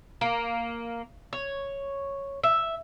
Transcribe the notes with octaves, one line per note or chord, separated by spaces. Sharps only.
A#3
C#5
E5